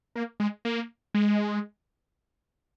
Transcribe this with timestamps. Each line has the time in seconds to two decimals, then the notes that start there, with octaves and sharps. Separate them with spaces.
0.16 A#3
0.40 G#3
0.65 A#3
1.14 G#3